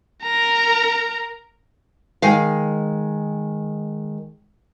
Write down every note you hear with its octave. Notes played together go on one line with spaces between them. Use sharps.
A#4 A#5
D#3 G#3 F5